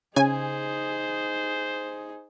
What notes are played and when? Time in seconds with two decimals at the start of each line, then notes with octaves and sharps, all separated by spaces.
0.16 C#3 D#4 G#4 C5 G#5